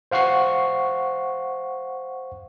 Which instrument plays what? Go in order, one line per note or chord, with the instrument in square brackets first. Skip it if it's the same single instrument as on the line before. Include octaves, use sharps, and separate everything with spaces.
[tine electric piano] C5 F5 F#5 C#6 C7